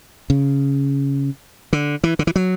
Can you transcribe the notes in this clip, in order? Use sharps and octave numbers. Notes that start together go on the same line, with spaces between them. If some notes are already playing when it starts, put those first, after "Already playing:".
C#3
D3
E3
D3
E3
F#3